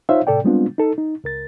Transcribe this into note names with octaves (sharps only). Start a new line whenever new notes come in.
D#4 F4 C5 C#5 E5 F5
A2 C3 A4 D5 G5
G3 G#3 B3 C4 D4 F4
D#4 A4
D#4
C#2 A#4 A6